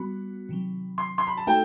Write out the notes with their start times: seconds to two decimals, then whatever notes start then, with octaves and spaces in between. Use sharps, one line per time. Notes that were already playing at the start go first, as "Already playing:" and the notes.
Already playing: G3 B3 F#4 B5
0.49 C3 D#3 F#3
0.98 C6
1.18 C6
1.27 B5
1.37 A5
1.47 A3 D#4 F#4 A4 C5 G5